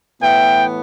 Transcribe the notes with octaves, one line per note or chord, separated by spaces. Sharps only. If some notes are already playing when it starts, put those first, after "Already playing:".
A2 E3 B3 E5 G5